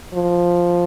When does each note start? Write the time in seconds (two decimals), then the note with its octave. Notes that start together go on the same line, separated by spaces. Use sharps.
0.14 F3